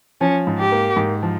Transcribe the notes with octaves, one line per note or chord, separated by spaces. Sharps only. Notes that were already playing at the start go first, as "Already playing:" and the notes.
F3 C#4
G#2
G4
A#3
G#2
F3